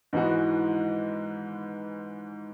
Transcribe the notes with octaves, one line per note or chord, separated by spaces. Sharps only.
G#2 E3 G#3 B3 F#4